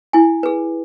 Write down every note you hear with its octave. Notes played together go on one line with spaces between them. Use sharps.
E4 G#5
G#4 B4